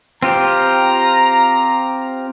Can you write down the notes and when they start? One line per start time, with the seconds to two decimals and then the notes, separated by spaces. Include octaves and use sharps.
0.23 C4 F4 G4 A#5